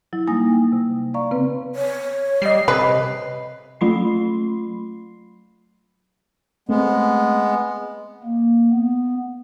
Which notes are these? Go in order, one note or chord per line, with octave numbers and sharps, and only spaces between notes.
F#3 E4
G3 A#3 D#4 G#5 D#6 A#6
G5
C3
D5 F5 A#5 C#6
C#3 B3 C4 B4
C#5
G3 D#5 C7
C3 B4
F#3 A3 F4 B5 C6 C7
G#3 A3 B3 C4
A#3
B3